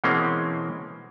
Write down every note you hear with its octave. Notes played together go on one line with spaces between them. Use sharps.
B2 E3 G#3 A#3 C4 C#4